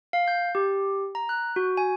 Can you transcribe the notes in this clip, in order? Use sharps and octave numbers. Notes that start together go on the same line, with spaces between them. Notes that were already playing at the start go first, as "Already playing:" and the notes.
F5
G6
G4
A#5
F#6
F#4
G#5